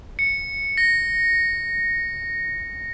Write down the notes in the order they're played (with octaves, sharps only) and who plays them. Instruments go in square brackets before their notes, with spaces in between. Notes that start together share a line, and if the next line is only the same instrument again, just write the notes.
[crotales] C#7
A#6